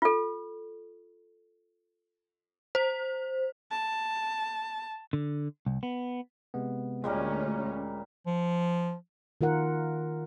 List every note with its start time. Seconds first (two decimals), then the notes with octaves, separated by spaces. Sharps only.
0.02 F4 A4
2.75 C5
3.71 A5
5.13 D3
5.66 C2
5.83 B3
6.54 C3 G#3 B3
7.04 D2 A#2 G3 G#3 A#3 C#4
8.27 F3
9.41 D#3 F4 A#4 F#5